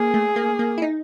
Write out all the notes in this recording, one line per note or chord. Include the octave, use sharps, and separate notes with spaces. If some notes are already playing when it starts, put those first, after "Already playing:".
Already playing: A#3 G#4
A3
A#3
A#3
E4
D#4